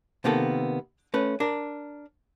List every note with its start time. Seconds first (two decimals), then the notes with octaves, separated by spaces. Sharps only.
0.24 C3 D#3 A#3 B3 A4
1.14 A3 C#4 B4
1.40 D4 A#4